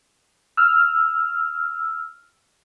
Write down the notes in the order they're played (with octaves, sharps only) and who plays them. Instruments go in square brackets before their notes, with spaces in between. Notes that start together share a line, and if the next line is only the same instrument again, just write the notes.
[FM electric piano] E6 F6